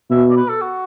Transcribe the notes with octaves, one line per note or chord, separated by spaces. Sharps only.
B2 E5
D5
B4
A4
F#4